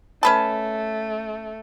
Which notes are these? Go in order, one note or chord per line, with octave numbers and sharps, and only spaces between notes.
A3 C#4 B4 A5